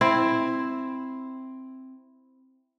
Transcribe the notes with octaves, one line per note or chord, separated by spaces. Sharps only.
C4 E4